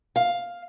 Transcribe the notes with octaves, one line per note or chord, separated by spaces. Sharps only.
F5